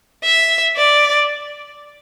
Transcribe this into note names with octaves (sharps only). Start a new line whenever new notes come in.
E5
D5